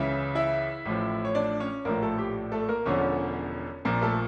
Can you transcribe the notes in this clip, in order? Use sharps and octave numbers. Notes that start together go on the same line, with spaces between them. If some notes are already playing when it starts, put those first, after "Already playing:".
Already playing: C#2 C#3 E3 E4 E5
E4 E5
A1 A2 F3
C#5
D4 D5
C#4 C#5
A#1 A2 F3 A#3 A#4
A3 A4
G4
A3 A4
A#3 A#4
E1 E2 D3 F3 C#4 C#5
A#1 A#2 F3 A#3 A#4
A3 A4